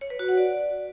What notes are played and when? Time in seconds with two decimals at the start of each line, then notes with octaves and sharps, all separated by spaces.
0.01 C#5
0.10 B4
0.19 F#4
0.28 F#5
0.37 D5